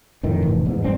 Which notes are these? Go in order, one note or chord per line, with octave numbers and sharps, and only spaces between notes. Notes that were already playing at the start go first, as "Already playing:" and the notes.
F2 A2 D#3
F1 A2 E3
E2 G#2
E1 G2 C4 D4